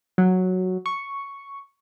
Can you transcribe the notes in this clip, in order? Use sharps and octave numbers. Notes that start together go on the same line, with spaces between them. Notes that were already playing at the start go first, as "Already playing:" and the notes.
F#3
C#6